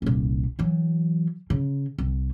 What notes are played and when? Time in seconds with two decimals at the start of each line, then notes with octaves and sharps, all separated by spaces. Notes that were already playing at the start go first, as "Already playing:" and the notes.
0.02 D#1 C2
0.59 E3 F#3
1.50 C#3
1.98 C2